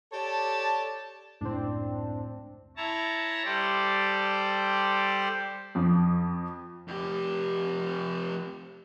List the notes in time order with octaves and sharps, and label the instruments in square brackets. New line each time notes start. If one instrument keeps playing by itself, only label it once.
[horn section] G4 A4 C#5 D5 A5
[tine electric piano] C#2 F#2 A2 [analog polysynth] C4 D4
[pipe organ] E4 C#5 A5 A#5
G3 G4 A4 C5 D5
[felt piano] F2 F3
[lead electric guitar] F2 G4